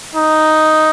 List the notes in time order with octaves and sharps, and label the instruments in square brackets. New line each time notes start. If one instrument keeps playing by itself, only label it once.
[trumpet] D#4